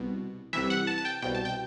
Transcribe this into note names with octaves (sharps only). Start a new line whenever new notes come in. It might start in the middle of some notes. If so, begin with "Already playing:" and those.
Already playing: C2 B2
C2 C3 E3 E5
F#5
A5
A5
G5
C2 B2 G5
A5
G5